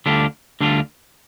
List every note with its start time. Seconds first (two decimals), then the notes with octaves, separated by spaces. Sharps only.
0.06 D2 D3 G3 D4 F4
0.61 D2 D3 G3 D4 F4